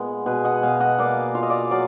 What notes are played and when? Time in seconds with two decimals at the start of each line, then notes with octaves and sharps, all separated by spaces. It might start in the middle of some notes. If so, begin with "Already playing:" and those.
Already playing: A#2 G#3 B3 G#4
0.26 B2 G#4 B4
0.44 D#5 F#5
0.63 B2 F5 G#5
0.80 D#5 F#5
0.99 A#3 D5 F5
1.35 F4 F5
1.43 D#5
1.50 D5 F5
1.71 F#3 D5 F5